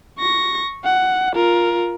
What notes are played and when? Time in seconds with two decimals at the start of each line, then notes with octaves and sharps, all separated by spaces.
0.19 C#6 A#6
0.85 F#5
1.35 F4 A#4